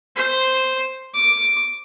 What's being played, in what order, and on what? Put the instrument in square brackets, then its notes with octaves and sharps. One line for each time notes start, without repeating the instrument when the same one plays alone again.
[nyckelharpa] C5
D6